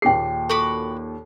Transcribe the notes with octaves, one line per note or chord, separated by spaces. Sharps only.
D#2 A#2 G#4 G5 C7
F#4 A4 B5 D6